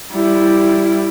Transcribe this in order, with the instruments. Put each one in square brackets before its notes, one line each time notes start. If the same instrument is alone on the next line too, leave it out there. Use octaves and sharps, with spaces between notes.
[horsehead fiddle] G3 E4